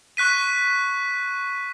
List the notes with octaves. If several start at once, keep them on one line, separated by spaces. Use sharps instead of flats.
C#6 F#6 B6 D#7